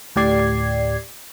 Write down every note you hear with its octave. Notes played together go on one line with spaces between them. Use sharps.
D2 A2 G4 D5 G#6 C7